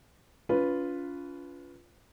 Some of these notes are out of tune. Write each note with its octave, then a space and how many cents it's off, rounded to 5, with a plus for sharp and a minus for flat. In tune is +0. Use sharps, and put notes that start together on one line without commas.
C#4 +40 F4 +0 B4 +0